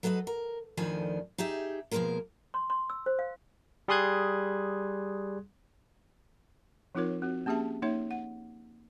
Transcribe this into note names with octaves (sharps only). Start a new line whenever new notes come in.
F#3 A4 B4 C#5 D#5
A#4
F2 A2 D#3 F3 D4 G#5
D#4 G4 G#4 E5
B2 F3 F#3 G#3 A#3 A#4
C6
C6
E6
C5
F5
G3 G#4 C6 D#6 F#6 G#6
F3 C4 D#4 F4 A#4 C#5
C4 F#4
A#3 C#4 G4 G#4 E5 A5
A#3 D#4 C#5 E5
F#5